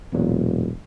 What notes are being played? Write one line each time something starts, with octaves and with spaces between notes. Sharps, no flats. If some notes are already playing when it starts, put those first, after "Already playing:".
E1 E2 A#2 F#3